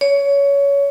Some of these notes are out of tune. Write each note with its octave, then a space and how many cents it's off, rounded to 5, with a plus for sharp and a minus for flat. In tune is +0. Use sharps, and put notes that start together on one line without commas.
C#5 +20